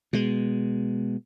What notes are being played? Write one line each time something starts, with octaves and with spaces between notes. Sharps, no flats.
B2 G#3